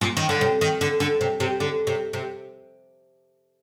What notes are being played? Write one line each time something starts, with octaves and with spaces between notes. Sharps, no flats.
A#2
D#3
D3
C3
D#3
D3
D3
C3
C3
D3
C3
C3